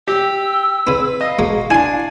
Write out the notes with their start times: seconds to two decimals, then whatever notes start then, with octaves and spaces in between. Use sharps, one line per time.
0.08 G4 G5 E6
0.87 C#3 C4 B4
1.21 D#5 F5
1.39 B2 G#3 A#3 F#4
1.70 D4 E4 G#5 C6